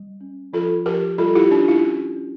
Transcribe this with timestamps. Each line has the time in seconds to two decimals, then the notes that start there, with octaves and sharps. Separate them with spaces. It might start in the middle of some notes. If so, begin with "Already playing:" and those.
Already playing: G3
0.21 C#4
0.53 F3 F4 A4
0.86 F3 G4 A#4
1.18 G3 F4 A4
1.35 E4 G4
1.51 C#4 D4 F4
1.68 E4
1.83 C#4
2.16 C#4